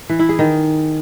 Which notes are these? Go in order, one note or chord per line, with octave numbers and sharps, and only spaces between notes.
E3
E4
G#4
D#3